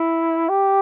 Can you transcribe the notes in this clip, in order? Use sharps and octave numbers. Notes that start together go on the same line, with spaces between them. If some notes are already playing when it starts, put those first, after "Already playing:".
Already playing: E4
G4